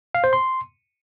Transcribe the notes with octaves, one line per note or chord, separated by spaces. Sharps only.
F5
C5
C6